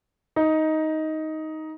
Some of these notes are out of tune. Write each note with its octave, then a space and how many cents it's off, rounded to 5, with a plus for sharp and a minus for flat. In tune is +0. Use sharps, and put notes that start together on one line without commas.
D#4 +10